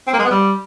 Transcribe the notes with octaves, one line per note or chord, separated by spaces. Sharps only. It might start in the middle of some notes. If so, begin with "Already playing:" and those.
C4
A#3
G#3
B3
G3